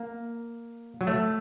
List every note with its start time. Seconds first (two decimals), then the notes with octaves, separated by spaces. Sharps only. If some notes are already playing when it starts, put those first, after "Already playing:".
Already playing: A#3
1.01 F#3
1.07 A3